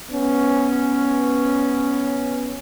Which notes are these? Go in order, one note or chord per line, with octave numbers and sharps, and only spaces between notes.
B3 C#4